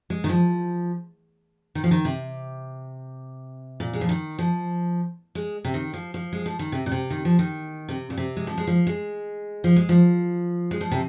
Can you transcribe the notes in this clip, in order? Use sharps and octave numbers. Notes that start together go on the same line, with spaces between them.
G#3
D#3
F3
D#3
F3
D#3
C3
A#2
G#3
F3
D#3
F3
G#3
C3
D#3
F3
F3
G#3
F3
D#3
C3
A#2
C3
D#3
F3
D#3
C3
A#2
C3
G#3
F3
G#3
F3
G#3
F3
G#3
F3
G#3
F3
C3